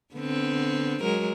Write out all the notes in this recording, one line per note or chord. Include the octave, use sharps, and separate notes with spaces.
D3 B3 C4
F#3 G#3 A#4